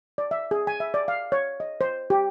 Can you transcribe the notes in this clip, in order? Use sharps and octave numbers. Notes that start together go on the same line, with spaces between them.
D5
E5
G#4
G#5
E5
D5
F5
C#5
D#5
C5
G4